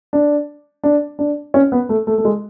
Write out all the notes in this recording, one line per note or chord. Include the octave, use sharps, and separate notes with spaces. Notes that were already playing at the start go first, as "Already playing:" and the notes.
D4
D4
D4
C#4
B3
A3
A3
A3
G#3